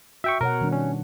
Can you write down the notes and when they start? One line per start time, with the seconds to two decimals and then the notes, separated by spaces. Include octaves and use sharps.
0.24 F#4 E5 G5 C#6
0.41 B2 A#4 C#5 F#5
0.61 D#3 G3 D4
0.72 C#4